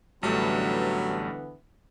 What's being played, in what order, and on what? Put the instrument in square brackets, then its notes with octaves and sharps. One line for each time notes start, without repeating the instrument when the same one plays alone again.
[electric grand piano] A1 G3 A3 [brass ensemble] D3 E3 B3 [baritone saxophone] F#3